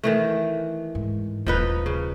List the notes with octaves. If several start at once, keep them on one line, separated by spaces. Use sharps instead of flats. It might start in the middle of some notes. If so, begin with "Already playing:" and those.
D#3 E3 A3
G#2
D#1 F3 D#4 B4
C#3